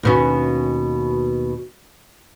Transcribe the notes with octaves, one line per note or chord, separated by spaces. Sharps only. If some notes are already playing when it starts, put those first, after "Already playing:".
D#2 B2 C#4